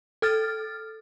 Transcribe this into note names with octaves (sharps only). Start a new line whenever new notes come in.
A4 F6 A6